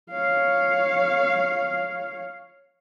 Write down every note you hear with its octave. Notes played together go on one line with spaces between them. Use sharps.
C#5 F5